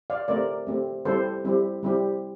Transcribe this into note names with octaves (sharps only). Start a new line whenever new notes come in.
D5 F5
A3 C4 G4 A#4 D5
A3 C4 G4
G3 C4 E4 G4 A4 C5
G3 C4 E4 G4
G3 C4 E4 G4